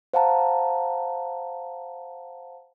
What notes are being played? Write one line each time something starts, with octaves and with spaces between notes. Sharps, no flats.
C5 F5 F#5 A5 A#5